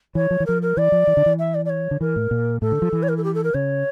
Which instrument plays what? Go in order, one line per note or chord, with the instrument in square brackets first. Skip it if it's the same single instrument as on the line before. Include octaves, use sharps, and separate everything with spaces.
[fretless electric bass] E3 [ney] C#5
[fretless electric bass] F3
E3
[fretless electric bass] F3 [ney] A#4
[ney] A#4
[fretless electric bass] E3 [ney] D5
[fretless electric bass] F3
E3
D3
E3
[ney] E5
D5
D5
C#5
[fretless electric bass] D3
[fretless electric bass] E3 [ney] A#4
[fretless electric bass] A2
A#2
[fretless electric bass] A2 [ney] A4
[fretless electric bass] D3
F3
E3
[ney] C#5
A#4
A4
G4
A4
A#4
[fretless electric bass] C#3 [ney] C#5